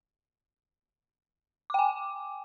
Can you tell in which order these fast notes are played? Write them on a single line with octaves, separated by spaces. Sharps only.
D6 G5 G#5